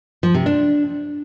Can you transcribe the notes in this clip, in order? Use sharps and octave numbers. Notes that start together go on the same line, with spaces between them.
F3
C3
D4